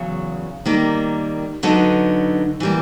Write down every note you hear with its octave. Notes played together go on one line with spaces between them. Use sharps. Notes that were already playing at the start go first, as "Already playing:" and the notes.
Already playing: E2 C#3 F#3
D#3 G3 A#3
D3 F#3 B3 D#4
E3 G3 A#3